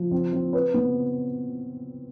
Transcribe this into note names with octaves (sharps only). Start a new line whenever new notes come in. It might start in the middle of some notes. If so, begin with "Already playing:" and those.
Already playing: F3
C4
C4
B4
B3